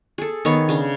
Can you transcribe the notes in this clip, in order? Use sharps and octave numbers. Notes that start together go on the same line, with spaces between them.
G#4 A4
D#3 B3 C#5
C#3 D4